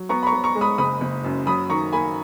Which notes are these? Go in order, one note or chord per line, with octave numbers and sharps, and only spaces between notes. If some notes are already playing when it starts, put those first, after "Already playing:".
Already playing: F#3
B3 A#5 C#6
B5
A#5 C#6
B3
A#5 C#6
G#3
B5 D#6
F#1 B5 D#6
F#1
F#2
F#3 B5 D#6
D#3 A#5 C#6
A#3 G#5 B5